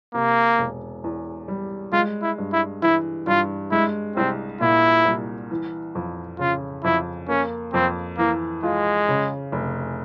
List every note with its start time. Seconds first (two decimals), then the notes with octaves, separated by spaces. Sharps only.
0.14 C3 A#3
0.58 E1
1.04 E2
1.48 G3
1.92 G#3 F4
2.22 E4
2.38 G2
2.53 E4
2.82 E3 E4
3.27 G2 F4
3.71 G#3 E4
4.16 C2 C4
4.61 A#2 E4
5.05 C2
5.51 E3
5.95 F2
6.39 C#3 F4
6.84 F2 E4
7.29 A#3 C#4
7.74 F2 C4
8.18 E3 A#3
8.63 G#3 F4
9.08 C#3
9.52 F1